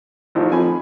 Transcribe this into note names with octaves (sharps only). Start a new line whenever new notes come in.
A1 D#3 F3
F2 G#5 B5